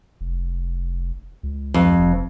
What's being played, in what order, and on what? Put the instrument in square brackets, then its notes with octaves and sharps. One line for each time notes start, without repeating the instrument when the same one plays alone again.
[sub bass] F1
C#2
[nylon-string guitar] F2
[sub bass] F1